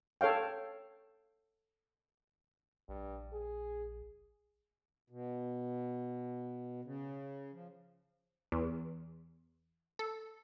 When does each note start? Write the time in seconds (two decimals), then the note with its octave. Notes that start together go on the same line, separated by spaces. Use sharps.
0.21 A4 C#5 F5 G5
2.89 A#1 G2
3.33 G#4
5.10 B2
6.85 C#3
7.52 F3
8.52 E2
9.99 A4